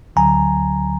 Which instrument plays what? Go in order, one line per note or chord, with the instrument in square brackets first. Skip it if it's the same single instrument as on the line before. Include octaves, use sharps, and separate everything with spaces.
[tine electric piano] D2 D3 F#3 G#5 A#5